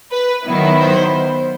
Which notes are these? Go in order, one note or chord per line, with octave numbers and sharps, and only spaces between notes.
B4
D#3 F#3 B3 E4
C5